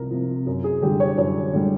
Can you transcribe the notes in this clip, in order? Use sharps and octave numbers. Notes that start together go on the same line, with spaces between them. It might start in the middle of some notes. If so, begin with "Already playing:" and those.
Already playing: C2 C3 F3 A#4
C3 F3
F#2
G#4
D3 G3 G4
C#5
F#2 C#5
D3 G3